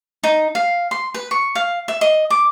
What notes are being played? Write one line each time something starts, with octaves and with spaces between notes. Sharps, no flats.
D#4
F5
C6
B4
C#6
F5
E5
D#5
D6